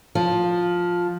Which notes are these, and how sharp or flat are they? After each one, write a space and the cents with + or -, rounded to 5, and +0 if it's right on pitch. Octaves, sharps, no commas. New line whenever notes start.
F3 +10